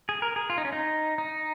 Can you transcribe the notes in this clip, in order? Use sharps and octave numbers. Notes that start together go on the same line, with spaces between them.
G#4
A#4
G#4
F4
D#4
C#4
D#4
D#4